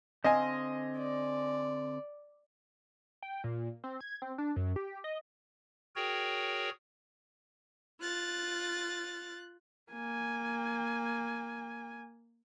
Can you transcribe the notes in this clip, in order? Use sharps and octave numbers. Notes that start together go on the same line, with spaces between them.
D3 C4 D#5 F5 G#5
D5
G5
A#2
C4
G#6
C4
D4
F#2
G4
D#5
F#4 G#4 A#4 C#5 G5
F4 F#6 A6
A#3 G#5